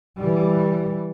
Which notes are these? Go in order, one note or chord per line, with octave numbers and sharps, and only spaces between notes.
E3 G3